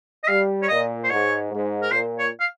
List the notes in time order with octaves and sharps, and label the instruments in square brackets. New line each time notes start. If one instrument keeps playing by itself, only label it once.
[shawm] D#5
[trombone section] G3 [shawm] F5
[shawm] C#5
[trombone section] A#2 [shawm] D#5
[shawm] C5
[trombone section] G#2 [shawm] C#5
[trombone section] G#2
[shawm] A#4
[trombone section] A#2 [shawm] C5
[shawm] C#5
F5